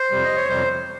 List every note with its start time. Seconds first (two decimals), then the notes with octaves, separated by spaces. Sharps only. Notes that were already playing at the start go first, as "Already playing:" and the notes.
Already playing: C5
0.11 F2 C3 G3
0.24 D#5
0.36 C#5
0.49 F2 C3 G3 C5